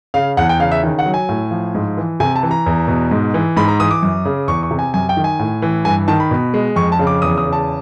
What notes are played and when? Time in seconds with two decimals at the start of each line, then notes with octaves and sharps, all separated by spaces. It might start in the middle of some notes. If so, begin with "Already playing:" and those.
0.14 C#3 F5
0.37 E2 F#5
0.49 G5
0.60 C#3 F5
0.72 E5
0.83 D#3
0.99 F#5
1.06 F#3
1.14 G#5
1.29 A2
1.51 F3
1.75 G#2
1.97 E3
2.20 C3 G#5
2.36 A5
2.43 E3
2.51 A#5
2.66 E2
2.88 B2
3.11 G#2
3.34 E3
3.57 G#2 B5
3.68 A#5
3.80 E3 D#6
3.91 D6
4.03 F#2
4.25 C#3
4.48 E2 C#6
4.63 C#6
4.71 C3
4.79 G#5
4.94 F#2 G#5
5.09 G5
5.17 D#3
5.24 G#5
5.39 A2
5.62 E3
5.85 G2 G#5
6.08 D#3 A5
6.20 B5
6.31 B2
6.54 G#3
6.76 F2 C#6
6.92 A5
6.99 C#3
7.07 D6
7.22 E2 D#6
7.38 D#6
7.45 C#3
7.53 A5